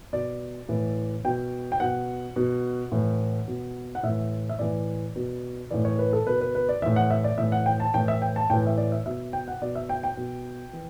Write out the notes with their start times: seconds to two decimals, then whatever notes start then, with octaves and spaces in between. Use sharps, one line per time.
0.13 B2 D5
0.69 A2 E3
1.25 B2 G5
1.72 G5
1.80 B2 F#5
2.36 B2
2.92 A2 E3
3.48 B2
3.95 F#5
4.03 A2 E3 E5
4.49 E5
4.59 A2 E3 D5
5.16 B2
5.71 A2 E3 D5
5.85 C#5
5.99 B4
6.13 A4
6.27 B2 B4
6.41 B4
6.55 B4
6.69 D5
6.82 A2 E3 E5
6.96 F#5
7.11 E5
7.24 D5
7.38 A2 E3 E5
7.52 F#5
7.66 G5
7.80 A5
7.94 A2 E3 G5
8.08 E5
8.22 G5
8.36 A5
8.50 A2 E3 G5
8.66 E5
8.78 D5
8.92 E5
9.06 B2 E5
9.33 G5
9.48 F#5
9.62 B2 D5
9.75 E5
9.89 G5
10.03 G5
10.17 B2
10.73 E3